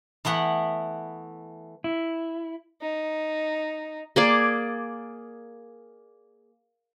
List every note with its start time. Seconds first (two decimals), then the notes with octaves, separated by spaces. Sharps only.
0.25 E3 A3 B3 F#5
1.84 E4
2.81 D#4
4.16 A#3 G#4 D5